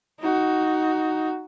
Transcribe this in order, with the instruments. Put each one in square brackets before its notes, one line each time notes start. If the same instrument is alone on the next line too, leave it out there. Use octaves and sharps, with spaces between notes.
[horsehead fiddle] D#4 F#4